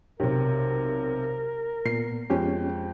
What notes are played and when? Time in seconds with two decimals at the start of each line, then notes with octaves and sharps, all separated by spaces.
0.20 B1 C3 G4 A#4
1.86 A#2 B3 C7
2.30 F2 G#3 B3 C#4 G4 G5